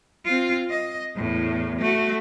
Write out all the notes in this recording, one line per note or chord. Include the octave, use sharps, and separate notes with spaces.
C4 F4
D#5
E2 A2
A3 F#4